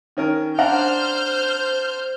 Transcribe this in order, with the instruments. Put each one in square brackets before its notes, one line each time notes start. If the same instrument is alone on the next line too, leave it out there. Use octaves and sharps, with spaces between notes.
[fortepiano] D#3 C#4 A#4
[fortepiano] D4 F#5 A#5 [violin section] C5 F6 G6